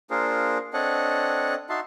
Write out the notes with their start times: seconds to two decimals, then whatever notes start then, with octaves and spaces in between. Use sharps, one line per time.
0.10 A#3 D4 F4 G#4 A#4 C5
0.73 C4 D4 A4 C#5 D#5 F#5
1.69 D#4 F#4 E5 A5 C6